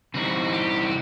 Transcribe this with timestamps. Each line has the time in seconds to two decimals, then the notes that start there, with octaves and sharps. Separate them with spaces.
0.14 C3 E3 G3 C4 D#4 F#4
0.53 G4
0.81 F#4